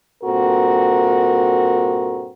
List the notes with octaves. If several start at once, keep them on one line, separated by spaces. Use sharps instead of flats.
G2 A#2 C4 F#4 A4 A#4